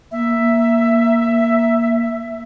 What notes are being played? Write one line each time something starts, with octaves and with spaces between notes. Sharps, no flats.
A#3 E5